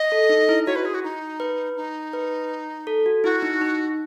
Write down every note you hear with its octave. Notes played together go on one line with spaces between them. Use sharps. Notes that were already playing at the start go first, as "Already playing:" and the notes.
Already playing: D#5
A4
D#4
E4
F#4 C#5
B4
G#4
F#4
D#4
B4
D#4
B4
A4
F#4
E4 F#4
D#4
D#4